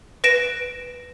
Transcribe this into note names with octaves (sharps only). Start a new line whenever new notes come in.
B4 A#6 D7 E7